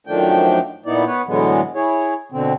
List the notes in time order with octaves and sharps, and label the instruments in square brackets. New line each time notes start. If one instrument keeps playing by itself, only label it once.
[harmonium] F#2 D#3 F3 A3 D4 G5
A#2 B3 D#4 E4 D5
B3 B4 C#5
A2 D3 E3 F#3 G#3 B3
E4 G#4 C#5
B2 D3 C4